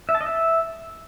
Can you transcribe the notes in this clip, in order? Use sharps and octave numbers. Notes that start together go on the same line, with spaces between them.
E5
A5
D#5
E5